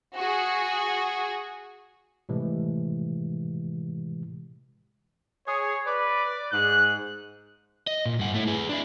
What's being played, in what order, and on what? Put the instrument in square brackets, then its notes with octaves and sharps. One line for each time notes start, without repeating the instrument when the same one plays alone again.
[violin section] F#4 G#4
[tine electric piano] A2 C3 E3 G#3 G4
[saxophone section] G#4 [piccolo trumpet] C#5
[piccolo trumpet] B4 [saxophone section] D5
[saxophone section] G#2 [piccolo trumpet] F#6
[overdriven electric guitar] D#5
A#2
G2 F#5
A3 E4
G#4 B4
D4 E4